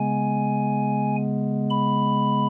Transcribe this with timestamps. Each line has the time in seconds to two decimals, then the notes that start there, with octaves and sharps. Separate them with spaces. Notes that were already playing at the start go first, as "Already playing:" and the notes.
Already playing: C#3 G#3 B3 G#5
1.70 B5